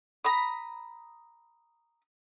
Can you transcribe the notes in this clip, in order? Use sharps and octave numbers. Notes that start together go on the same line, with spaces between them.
A#5 B5 D#6